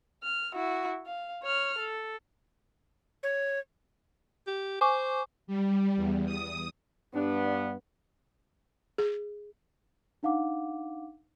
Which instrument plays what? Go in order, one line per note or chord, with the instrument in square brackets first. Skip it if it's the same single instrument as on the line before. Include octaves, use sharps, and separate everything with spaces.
[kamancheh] F6
E4 F#4
F5
C#5 F6
A4
[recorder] C#5
[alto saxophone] G4
[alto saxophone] C5 [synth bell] G#5 C#6 D6
[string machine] G3
E2
D#6
[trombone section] G2 B3 [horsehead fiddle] D4
[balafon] G#4
[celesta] D4 D#4 F5 F#5 D6